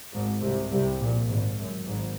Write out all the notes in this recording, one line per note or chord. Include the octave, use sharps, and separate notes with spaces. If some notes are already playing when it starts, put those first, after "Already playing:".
G#1 G#2
C2 C3
C2 C3
A#1 A#2
G#1 G#2
F#2
G#1 G#2